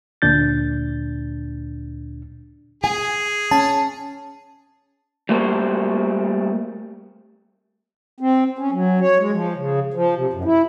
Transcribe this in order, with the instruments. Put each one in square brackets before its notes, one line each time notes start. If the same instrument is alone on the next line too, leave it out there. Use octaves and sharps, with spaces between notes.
[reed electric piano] D2 A#2 D4 G6 A6
[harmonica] G#4 [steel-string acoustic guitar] G#5
[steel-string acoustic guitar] C#4 [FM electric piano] A5
[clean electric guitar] G3 A3 A#3 F#4 C5
[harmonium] C4
C#4
F#3
C#5
G#3
F3
C#3
F3
C3
F#2
E4